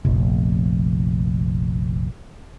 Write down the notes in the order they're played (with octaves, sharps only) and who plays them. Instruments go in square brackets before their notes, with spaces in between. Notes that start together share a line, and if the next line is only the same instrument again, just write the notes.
[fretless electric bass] F1 A#1